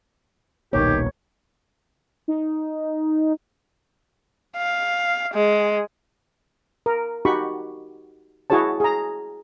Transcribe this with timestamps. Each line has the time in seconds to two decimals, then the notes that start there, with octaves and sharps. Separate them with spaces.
0.73 D#1 B1 A#2 D#3 G4 C#5
2.28 D#4
4.57 F5
5.34 G#3
6.86 A#4
7.25 D#4 F#4 G4 B5 C#6
8.50 E4 F#4 G#4 C#5 A5
8.80 G#4 A#5